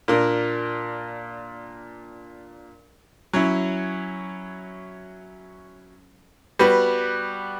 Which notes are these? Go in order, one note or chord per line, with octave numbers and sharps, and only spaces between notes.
A#2 A#3 D4 A#4
F#3 C#4 E4
G3 B3 F#4 B4